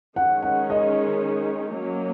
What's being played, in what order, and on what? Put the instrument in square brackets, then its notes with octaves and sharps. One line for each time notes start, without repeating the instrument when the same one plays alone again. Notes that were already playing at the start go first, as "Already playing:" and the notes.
[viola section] D#3 G#3 C#4 [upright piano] F#5
[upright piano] F#5
D#5
[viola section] F#3 A#3 C#4